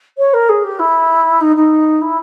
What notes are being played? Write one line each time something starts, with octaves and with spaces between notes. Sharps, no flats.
C#5
A#4
G#4
G4
E4
D#4
D#4
E4